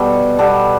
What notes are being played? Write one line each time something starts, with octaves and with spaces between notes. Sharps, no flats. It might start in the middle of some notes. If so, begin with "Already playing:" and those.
Already playing: B2 G3 A4
B2 G3 A4